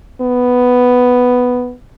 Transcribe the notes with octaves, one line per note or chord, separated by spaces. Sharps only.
B3